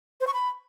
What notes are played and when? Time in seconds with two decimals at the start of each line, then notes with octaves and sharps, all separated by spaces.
0.21 C5
0.27 C#6
0.34 B5